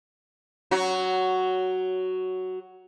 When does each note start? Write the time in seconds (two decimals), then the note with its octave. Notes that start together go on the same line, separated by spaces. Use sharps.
0.71 F#3 F#4